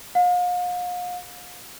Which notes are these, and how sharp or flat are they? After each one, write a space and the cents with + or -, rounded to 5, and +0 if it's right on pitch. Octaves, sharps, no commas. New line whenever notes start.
F5 +40